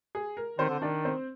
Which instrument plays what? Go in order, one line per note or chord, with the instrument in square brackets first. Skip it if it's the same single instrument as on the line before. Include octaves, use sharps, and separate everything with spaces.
[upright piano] G#4
A#4
[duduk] D#3 [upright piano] C4 C5
[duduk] D3
[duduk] D#3 [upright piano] D4 D5
[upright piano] C4 C5